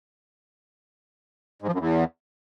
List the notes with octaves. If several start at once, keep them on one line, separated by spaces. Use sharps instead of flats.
G#2
F3
F#2
E2